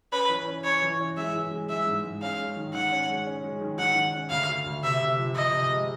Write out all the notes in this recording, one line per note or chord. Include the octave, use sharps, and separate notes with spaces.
C#4 B4
E3
C#4
C#4 C#5
E3
C#4
G#3 E5
E3
G#3
G#3 E5
G#2
G#2
C#4 F5
G#3
D#3
D#3 F#5
C#4
G#3
C#4
G#3
D#3
D#3 F#5
D#3
C#4
D2 F5
D2
D2
C3 E5
C3
F3
C3 D#5
C3
G#3